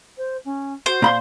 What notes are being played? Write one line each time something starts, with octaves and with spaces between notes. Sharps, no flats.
C5
C#4
F#4 C5
A#2 F5 B5 C6